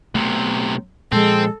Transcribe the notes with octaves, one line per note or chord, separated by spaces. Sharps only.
B1 C3 A3 B3
A#2 F3 G#3 C4 A4